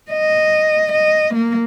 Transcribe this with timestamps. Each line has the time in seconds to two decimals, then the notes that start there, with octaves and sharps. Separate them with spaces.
0.11 D#5
0.92 D#5
1.34 A#3